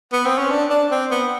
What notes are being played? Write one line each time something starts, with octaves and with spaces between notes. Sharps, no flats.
B3
C4
C#4
D4
D4
C4
B3